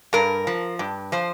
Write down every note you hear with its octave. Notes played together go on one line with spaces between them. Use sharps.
G2 A#4
F3
G2
F3 C5